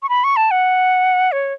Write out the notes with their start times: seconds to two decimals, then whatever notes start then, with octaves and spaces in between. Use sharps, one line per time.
0.03 C#6
0.09 B5
0.24 C#6
0.36 A5
0.51 F#5
1.32 C#5